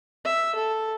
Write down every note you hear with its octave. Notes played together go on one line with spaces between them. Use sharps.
E5
A4